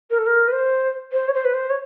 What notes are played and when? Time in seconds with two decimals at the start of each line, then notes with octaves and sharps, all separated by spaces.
0.10 A#4
0.18 A4
0.26 A#4
0.47 B4
0.52 C5
1.12 C5
1.28 C#5
1.33 C5
1.44 B4
1.54 C5
1.69 C#5